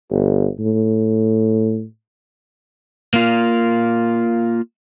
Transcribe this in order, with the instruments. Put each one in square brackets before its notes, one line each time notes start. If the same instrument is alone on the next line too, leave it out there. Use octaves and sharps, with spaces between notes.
[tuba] G1
A2
[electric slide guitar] A#3 F4